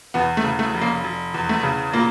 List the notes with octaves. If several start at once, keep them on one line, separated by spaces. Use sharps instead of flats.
E2 B3
A3
C#3
A3
F1
A#3
F1
E2
A3
C#3
A#2 A#3